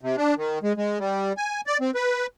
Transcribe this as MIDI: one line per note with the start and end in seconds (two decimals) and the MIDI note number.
0.01 0.16 48
0.17 0.34 62
0.37 0.59 51
0.63 0.73 56
0.77 0.98 56
0.99 1.33 55
1.37 1.61 80
1.67 1.77 74
1.81 1.91 60
1.95 2.26 71